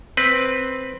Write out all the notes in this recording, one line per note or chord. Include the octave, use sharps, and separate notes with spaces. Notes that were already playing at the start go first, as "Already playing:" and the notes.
C4 B4